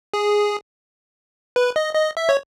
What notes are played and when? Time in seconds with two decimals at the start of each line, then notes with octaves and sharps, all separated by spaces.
0.14 G#4
1.56 B4
1.76 D#5
1.95 D#5
2.17 E5
2.29 C#5